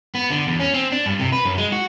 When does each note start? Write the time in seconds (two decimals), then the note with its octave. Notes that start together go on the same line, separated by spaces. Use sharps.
0.15 B3
0.30 D3
0.47 E2
0.60 C#4
0.74 C4
0.92 D4
1.06 G2
1.20 C3
1.32 B4
1.45 F#2
1.57 G#3
1.72 F#4